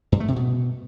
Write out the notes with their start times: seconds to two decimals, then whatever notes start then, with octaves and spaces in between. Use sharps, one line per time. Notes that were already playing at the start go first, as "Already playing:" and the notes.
0.12 G2
0.20 A3
0.28 C3
0.36 B2